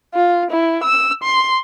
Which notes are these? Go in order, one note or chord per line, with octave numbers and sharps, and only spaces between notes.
F4
E4
E6
C6